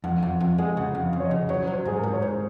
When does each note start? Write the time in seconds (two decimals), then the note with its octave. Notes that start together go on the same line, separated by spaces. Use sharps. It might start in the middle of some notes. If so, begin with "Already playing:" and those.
0.04 F2 F#5
0.23 F2 F#5
0.40 F2 F#5
0.58 G#3 G#4
0.77 C#3 F#5
0.95 F2
1.01 F5
1.13 F2
1.20 C#5
1.25 D#5
1.31 C#3
1.49 F#3 C#5
1.64 F#3 C#5
1.73 C5
1.85 G#2 G#4
1.98 A#4
2.03 G#2
2.13 C#5
2.22 G#2 C5